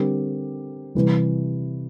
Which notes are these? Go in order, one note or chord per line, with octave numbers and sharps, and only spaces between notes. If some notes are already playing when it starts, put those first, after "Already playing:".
Already playing: D3 G3 C4 G4 A#4
C3 E3 G3